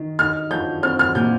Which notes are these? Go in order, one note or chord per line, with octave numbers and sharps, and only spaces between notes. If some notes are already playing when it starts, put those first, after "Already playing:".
Already playing: D#3
D#4 F6
F3 G6
C4 F6
F6
A#2 G6